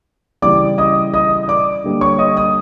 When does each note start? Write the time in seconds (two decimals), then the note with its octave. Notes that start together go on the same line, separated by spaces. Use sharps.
0.42 C#3 E3 G3 D5 D6
0.78 D#5 D#6
1.14 D#5 D#6
1.43 D#6
1.48 D5 D6
1.84 D3 G3 A#3
2.01 C#5 C#6
2.19 D#5 D#6
2.36 D#5 D#6